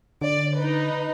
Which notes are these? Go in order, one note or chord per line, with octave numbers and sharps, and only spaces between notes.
D3 D5
D#4 B4